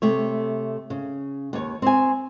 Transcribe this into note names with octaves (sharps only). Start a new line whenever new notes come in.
C3 A3 C#5
C#3
D#2 C#5
C4 C5 C#5 G#5